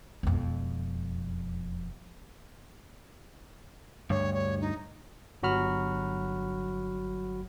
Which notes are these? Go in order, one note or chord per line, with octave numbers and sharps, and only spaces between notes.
E1 F2
D2 G2 C#5
C#5
D#4
G1 F#3 F#4 B5 F6